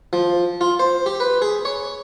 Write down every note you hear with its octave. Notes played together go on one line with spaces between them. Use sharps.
F3
F4
C5
G4
B4
G#4
C#5